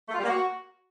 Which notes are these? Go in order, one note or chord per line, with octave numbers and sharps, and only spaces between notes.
A3
F4
G3
A#3
F#4